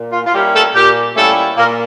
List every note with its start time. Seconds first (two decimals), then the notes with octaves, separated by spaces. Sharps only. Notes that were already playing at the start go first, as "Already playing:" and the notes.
Already playing: A#2
0.12 F4
0.26 F4
0.34 G3 A#3 C#4 E4 G4
0.54 A3 A4
0.75 A#2 G4
1.16 G3 A3 A#3 C#4 E4 A4
1.57 A#2 A#3 A#4